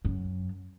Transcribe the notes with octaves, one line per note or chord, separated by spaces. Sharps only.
F#2